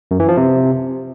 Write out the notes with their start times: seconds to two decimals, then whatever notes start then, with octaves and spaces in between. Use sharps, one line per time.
0.11 F#2
0.20 E3
0.28 F3
0.37 C3